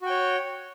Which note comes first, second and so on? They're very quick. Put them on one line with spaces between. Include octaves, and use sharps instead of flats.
F#4 G5 C#5